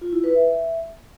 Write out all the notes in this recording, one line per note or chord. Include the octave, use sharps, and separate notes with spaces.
F4
E4
B4
E5